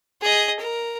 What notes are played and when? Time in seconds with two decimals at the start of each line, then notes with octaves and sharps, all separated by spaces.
0.22 G#4 D#5
0.59 A#4